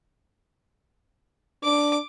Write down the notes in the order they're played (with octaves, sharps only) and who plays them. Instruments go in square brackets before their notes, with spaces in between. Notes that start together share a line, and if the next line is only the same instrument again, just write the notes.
[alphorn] D4 [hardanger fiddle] D6